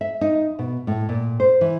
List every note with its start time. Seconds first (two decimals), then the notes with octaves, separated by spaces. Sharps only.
0.01 E5
0.21 D#4
0.59 B2
0.87 A2
1.09 A#2
1.40 C5
1.61 E3